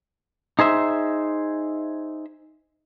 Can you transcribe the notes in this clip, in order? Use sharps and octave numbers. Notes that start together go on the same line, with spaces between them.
D#4 G#4 C5 E5